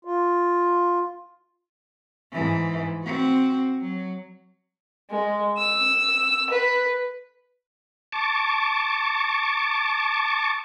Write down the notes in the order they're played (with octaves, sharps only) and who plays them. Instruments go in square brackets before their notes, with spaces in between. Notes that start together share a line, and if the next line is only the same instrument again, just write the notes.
[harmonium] F4
[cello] G#2 E3
C4 F#4
F#3
[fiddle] G#3
E6
B4
[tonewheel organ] A5 C#6 D6